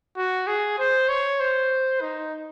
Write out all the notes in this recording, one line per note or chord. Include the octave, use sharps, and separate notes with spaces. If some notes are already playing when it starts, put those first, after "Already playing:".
F#4
G#4
C5
C#5
C5
D#4